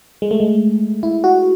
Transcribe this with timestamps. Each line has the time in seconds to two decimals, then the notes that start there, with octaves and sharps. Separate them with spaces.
0.22 G#3
0.31 A3
0.40 G#3
1.03 E4
1.24 F#4